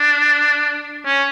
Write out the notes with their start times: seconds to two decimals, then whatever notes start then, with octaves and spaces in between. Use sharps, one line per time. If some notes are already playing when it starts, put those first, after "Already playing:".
Already playing: D4
1.05 C#4